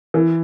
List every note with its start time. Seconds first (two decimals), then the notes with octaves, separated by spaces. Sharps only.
0.14 E3